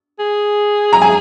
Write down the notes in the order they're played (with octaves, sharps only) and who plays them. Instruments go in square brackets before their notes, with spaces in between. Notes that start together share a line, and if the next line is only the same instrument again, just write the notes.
[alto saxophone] G#4
[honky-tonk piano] A#5
G#5